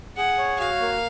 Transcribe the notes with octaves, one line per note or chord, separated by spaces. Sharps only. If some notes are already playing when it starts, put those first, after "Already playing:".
G#4 F#5
C#5
F#4 F5
A#3